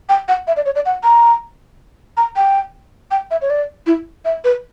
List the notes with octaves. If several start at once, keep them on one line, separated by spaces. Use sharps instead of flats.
G5
F#5
E5
D5
C#5
D5
F#5
A#5
A#5
G5
G5
E5
C#5
D5
E4
E5
B4